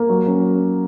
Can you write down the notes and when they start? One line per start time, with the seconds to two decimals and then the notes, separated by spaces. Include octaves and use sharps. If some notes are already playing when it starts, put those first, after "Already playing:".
Already playing: A#3
0.09 F#3
0.26 C#4